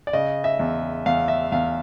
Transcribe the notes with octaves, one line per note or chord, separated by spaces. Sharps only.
D5
C#3 D#5
E5
E2
E2 F5
E5
E2 F5